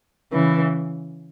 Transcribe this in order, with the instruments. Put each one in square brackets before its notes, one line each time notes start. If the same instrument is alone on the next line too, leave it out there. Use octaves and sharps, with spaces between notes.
[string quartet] C#3 E3